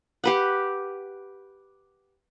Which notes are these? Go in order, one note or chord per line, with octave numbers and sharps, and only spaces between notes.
G4 B4 F#5